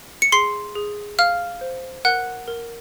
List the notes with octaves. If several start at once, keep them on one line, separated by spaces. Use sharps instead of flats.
C#7
G#4 C6 C7
G#4
F5 F6
C5
A#4 F#5 F#6
A#4